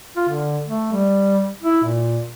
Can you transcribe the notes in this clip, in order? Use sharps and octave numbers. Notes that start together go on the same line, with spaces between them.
F4
D3
A3
G3
E4
A#2